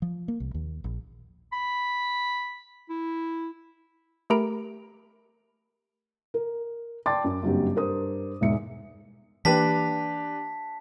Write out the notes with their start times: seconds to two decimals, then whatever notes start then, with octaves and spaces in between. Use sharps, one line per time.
0.02 F3
0.28 A#3
0.40 C2
0.54 D#2
0.84 A#1
1.52 B5
2.89 E4
4.30 A3 G4 A#4 A#5 B5 D7
6.34 A#4
7.06 D5 G5 A5 C6 D6 A6
7.24 F#2
7.42 F#1 G2 F#3 C4 G4
7.75 G2 A#4 C5 D#6
8.41 E1 E2 G#2 G#3 E5 C#7
9.45 E3 A#3 D4 G4 B4 A5 B6